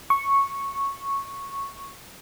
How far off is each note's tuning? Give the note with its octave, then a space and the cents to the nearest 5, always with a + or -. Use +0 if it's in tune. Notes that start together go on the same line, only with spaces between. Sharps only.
C#6 -5